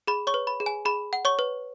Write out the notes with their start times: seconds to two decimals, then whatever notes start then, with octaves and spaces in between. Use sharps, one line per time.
0.08 G#4 B5
0.27 C#5 C#6
0.34 B4
0.47 B5
0.60 G#4
0.66 G#5
0.85 G#4 B5
1.13 F#5
1.25 C#5 C#6
1.39 B4